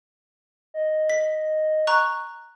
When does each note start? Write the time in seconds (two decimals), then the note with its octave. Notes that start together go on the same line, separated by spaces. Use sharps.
0.74 D#5
1.10 B6
1.87 A#5 C#6 F#6